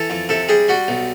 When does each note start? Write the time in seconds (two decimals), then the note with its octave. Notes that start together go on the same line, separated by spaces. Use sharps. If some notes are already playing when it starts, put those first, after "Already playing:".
Already playing: E3 A4
0.10 F2
0.29 C3 A4
0.49 G3 G#4
0.68 G3 F#4
0.88 B1